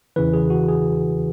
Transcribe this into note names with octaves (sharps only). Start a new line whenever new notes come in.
E2 C#3 E3 B4
G#4
F#4
G#4